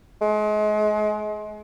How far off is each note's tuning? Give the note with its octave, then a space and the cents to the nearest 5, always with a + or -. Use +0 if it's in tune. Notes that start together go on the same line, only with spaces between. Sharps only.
G#3 +35